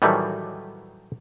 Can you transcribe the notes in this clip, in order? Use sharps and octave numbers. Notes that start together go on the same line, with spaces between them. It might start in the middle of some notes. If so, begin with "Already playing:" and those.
A2 D#3 E3 F#3 G3 A3